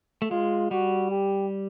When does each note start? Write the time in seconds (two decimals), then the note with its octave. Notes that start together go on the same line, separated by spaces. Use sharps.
0.22 A3
0.31 G#3 F4
0.71 G3 F#4
1.11 G4